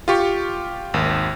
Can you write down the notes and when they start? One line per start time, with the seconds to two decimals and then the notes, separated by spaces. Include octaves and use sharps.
0.08 F4 G4 C#6
0.94 G#1 D#2